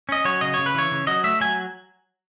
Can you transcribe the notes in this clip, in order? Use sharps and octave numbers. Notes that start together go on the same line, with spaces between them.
C#4 D#5
F#3 C#5
C#3 D#5
C#3 C#5
B4
E3 C#5
C#3
F#3 D#5
A3 E5
F#3 G#5